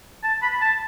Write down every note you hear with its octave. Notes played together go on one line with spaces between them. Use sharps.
A5
B5
A5